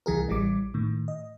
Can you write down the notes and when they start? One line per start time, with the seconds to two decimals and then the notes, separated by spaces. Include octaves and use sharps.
0.06 C2 E3 G#4 A#4
0.28 A1 E3 G3 D6
0.74 A2 D#3
1.08 D#5